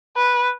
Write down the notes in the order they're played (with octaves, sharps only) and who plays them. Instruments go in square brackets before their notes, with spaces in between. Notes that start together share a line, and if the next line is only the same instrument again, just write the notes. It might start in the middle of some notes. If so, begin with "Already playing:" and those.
[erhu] B4